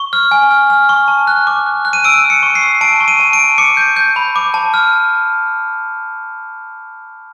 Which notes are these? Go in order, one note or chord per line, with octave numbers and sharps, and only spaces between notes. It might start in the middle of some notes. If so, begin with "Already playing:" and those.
Already playing: C#6
F6
G#5
F6
F6
C#6
A5
F#6
D6
F#6
F#6
D#7
E6 D7
E6
C#7
C#6
C7
E6
A5 D7
C#6
D#7
A5
D7
A5
D6 C#7
G6
G6
B5
D6
A5
F6